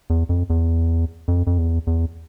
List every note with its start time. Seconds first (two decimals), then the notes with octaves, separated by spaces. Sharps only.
0.10 E2
0.29 F2
0.50 E2
1.28 F2
1.47 F2
1.58 E2
1.87 E2